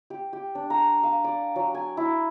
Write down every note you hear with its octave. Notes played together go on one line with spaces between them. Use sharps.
G4
G4
D4
A#5
F5
D5
F#3
G#5
E4